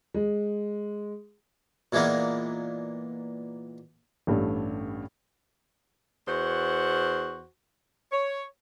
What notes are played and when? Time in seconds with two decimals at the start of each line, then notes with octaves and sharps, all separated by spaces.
0.14 G#3
1.92 A#2 E3 G#3 A#3 B3
4.27 A1 G2 G3 A3
6.27 E2 F#4 C5
8.10 C#5